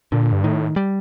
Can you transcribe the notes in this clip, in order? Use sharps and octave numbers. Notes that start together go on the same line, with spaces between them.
A#2 D3
G2
A2 D#3
G3